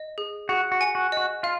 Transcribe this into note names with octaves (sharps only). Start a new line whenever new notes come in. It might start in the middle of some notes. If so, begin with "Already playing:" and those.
Already playing: D#5
G#4
F#4 G#4
F#4
G#5
F#4
F#4 D#5
F4 F5